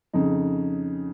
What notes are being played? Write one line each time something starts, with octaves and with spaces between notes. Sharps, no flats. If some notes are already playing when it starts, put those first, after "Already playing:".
F2 C#3 D#4